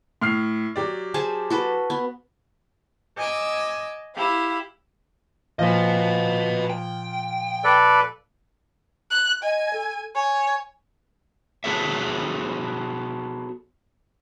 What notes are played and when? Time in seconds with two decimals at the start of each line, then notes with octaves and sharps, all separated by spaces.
0.21 A2 F6 C7
0.76 F#3 G4 D5
1.14 G#4 C5 A5
1.50 F#4 A4 B4
1.90 B3
3.16 D#5 G#5 D6 E6
4.13 E4 G4 F5
5.59 A#2 F3 B4 D#5
6.70 G5
7.64 A4 B4 D5
9.11 F#6
9.43 D#5 G#5
9.73 A4
10.15 C#5 G#5
11.64 B3 F#4 G#4 A4 C#5 E5